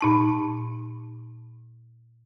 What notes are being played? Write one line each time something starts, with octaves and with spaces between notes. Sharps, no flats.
A#2 D#4 A5